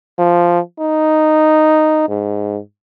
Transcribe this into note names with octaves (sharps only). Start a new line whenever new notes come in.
F3
D#4
G#2